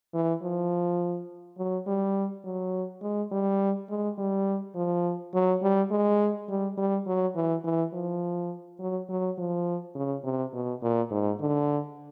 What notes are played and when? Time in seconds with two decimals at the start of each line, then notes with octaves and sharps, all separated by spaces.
0.14 E3
0.42 F3
1.58 F#3
1.87 G3
2.44 F#3
3.02 G#3
3.32 G3
3.90 G#3
4.18 G3
4.75 F3
5.34 F#3
5.62 G3
5.91 G#3
6.49 G3
6.78 G3
7.07 F#3
7.35 E3
7.64 E3
7.93 F3
8.80 F#3
9.10 F#3
9.38 F3
9.95 C#3
10.24 C3
10.53 B2
10.82 A#2
11.11 G#2
11.40 D3